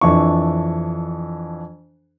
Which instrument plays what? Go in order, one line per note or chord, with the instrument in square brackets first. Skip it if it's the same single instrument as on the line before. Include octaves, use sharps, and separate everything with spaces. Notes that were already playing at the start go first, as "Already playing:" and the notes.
[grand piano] F2 E3 D4 C#6